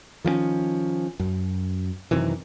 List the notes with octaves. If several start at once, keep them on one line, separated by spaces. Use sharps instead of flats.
D#3 F3 A#3 C#4
F#2
F#2 C3 D#3 E3